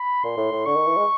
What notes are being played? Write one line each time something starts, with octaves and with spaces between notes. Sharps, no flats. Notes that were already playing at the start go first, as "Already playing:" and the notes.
Already playing: B5
A#2 C6
A2
A2
D3 C#6
D#3
E3
G#3